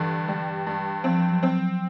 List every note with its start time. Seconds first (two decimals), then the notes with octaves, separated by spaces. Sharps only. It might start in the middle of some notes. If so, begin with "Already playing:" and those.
Already playing: G2 D3 E3
0.28 G3
0.67 G2
1.04 F3 C4
1.29 F#3
1.43 C4
1.55 F#3